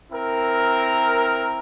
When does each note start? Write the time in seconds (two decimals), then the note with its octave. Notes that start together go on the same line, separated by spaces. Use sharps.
0.10 C4 E4 A#4